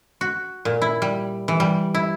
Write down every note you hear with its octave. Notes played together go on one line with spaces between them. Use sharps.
F#4
A#2
E4
G3
E3
G3
E4